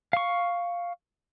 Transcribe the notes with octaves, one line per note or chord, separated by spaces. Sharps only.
F5 C#6